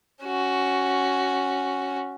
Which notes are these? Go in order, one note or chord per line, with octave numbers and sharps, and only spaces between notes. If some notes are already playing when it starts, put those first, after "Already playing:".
C#4 F#4